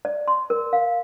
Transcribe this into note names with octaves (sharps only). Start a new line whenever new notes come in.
D5
C6
A#4
F5